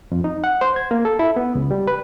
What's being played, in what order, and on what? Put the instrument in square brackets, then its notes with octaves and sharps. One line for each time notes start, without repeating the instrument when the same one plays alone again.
[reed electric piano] F2
D#4
F#5
C5
G#6
A#3
A4
E4
B3
C#2
G3
B4